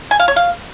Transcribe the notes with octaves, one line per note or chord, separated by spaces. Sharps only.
G#5
F5
C#5
F5